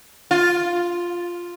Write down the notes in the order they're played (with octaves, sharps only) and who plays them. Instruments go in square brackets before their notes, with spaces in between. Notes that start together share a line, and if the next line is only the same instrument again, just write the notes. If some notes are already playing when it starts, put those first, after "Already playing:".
[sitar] F4